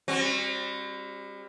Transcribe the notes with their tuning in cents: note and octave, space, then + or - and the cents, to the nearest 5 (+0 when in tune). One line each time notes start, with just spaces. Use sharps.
G3 +35 C4 +45 F#4 +0